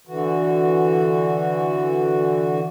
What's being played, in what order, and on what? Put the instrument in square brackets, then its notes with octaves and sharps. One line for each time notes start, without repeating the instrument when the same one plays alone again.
[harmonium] D3 E3 F#4